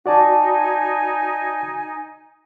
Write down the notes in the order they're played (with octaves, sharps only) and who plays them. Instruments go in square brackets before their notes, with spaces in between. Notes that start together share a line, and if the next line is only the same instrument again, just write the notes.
[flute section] D#4 G#5 [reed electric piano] F#4 D5 A5